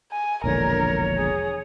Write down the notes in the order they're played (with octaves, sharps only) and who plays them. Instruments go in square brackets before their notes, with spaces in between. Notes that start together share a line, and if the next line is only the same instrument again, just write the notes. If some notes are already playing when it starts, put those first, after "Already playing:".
[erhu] G#5
[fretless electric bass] E1 A#1 D3 [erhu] A#4 [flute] C#5
[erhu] G#4